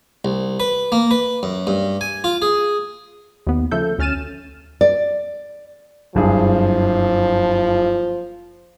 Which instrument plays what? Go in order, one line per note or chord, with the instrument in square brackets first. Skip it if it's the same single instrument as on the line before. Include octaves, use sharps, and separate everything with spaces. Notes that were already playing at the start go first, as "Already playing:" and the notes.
[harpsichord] C2
B4
A#3
B4
F#2
G2
G#5
F4
G#4
[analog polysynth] D#2 B3
C#3 F3 A3 A4 G6
D2 C#4 F6 A6 D#7 E7
[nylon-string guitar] D5
[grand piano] F#1 G2 G#4 [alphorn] F3